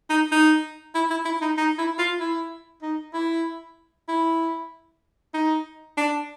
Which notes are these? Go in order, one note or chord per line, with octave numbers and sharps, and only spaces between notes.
D#4
D#4
E4
E4
E4
D#4
D#4
E4
F4
E4
D#4
E4
E4
D#4
D4